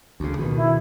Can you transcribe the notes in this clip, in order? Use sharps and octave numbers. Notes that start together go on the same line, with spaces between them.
D2 C#3
B2 D#3
E4